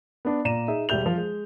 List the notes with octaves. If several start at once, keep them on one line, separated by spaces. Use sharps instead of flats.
B3 D4
A#2 D5 A#5 D#7 E7
D#4 G#4 E5
E1 G3 E5 G6 F7
F3
G#3